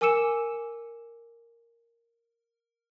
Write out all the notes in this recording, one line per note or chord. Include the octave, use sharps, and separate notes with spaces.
A#4 G#5 D6 E6 C#7 E7